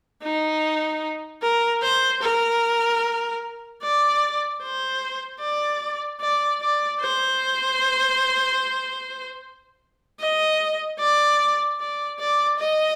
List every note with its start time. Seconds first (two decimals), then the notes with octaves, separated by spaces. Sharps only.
0.23 D#4
1.42 A#4
1.82 C5
2.22 A#4
3.82 D5
4.62 C5
5.41 D5
6.21 D5
6.61 D5
7.01 C5
10.20 D#5
11.00 D5
11.79 D5
12.19 D5
12.59 D#5